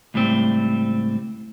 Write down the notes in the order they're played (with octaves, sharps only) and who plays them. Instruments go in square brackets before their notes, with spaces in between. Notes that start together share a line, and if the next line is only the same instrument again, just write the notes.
[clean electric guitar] C#2 A2 G3 C4